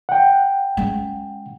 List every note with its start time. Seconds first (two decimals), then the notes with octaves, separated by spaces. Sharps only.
0.09 F#5 G5
0.77 G#3 C#4